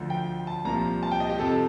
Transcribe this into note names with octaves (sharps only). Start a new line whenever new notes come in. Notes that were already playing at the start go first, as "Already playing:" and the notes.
Already playing: D2 D3 F3
G5
A5
C2 A#2 F3 A#5
A5
G5
D#5
G4
F2 C3 F3 A4